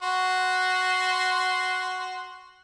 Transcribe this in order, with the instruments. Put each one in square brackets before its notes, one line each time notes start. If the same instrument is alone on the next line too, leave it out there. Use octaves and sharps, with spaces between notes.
[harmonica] F#4 C6